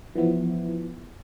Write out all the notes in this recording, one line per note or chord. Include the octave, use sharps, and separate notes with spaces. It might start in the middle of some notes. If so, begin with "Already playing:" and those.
E3 F3 B3 E4